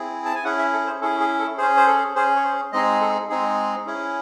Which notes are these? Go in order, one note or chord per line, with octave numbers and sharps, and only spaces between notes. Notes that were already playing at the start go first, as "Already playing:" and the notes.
Already playing: C4 E4 G#4
A5
G#5
C#4 E4 G#4 F#5
E5
A4
C5
C#4 E4 G#4 A4
G#4
A4
C#4 G#4 C5
C5
A4
C#4 G#4 C5
C#5
C5
G#3 C4 D#4 G#4 D#5
A4
G#3 C4 D#4 G#4
C#4 E4 G#4